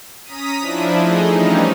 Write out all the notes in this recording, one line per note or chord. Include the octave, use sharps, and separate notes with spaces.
C#4 A#5 D#6 B6 D#7
F3 D4 E4
A3 D#4 G#4 D#5
E3 F3 G3 C#4 D#4